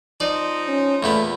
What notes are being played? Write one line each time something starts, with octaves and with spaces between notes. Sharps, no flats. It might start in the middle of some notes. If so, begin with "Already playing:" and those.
F3 C4 D#4 D5
C#4
E2 A#2 A3 B3